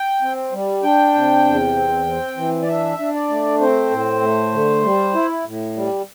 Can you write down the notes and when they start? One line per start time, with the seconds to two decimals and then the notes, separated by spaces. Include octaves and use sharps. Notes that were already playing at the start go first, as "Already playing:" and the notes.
Already playing: G5
0.22 C4
0.52 G3
0.83 D4 G5
1.14 C3
1.45 E2
1.75 C4
2.06 C4
2.37 E3
2.62 D5
2.67 D4 E5
2.99 D4
3.14 D5
3.29 A3
3.60 C4 C5
3.90 A2
4.21 A3
4.52 D3
4.83 G3
5.14 E4
5.45 A2
5.76 G3